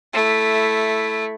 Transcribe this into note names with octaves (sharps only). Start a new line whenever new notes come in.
A3 E4